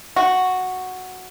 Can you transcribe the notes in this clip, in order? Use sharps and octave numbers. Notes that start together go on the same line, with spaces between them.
F#4